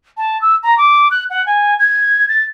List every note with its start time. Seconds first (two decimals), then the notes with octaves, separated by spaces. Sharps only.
0.17 A5
0.41 E6
0.63 A#5
0.78 D6
1.11 F#6
1.30 F#5
1.46 G#5
1.79 G#6
2.29 A6